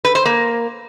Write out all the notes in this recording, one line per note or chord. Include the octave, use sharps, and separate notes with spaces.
B4
C5
A#3